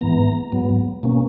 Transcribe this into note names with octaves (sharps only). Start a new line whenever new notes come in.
G#2 E3 B3 A#5
G#2 F#3 B3
B2 A#3 C#4